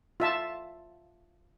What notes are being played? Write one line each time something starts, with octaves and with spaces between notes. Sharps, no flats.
F4 E5 A5